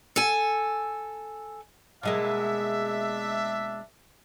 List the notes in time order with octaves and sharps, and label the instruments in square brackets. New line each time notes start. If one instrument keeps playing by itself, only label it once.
[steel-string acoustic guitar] A4 G#5
[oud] B2 G#3 A#3 [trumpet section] D4 E5